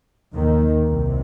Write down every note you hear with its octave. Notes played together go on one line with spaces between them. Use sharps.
D#2 D#3
C2 C3